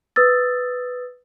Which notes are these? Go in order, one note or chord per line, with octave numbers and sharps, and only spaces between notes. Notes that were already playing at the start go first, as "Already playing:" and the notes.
B4 D#6 E6 A6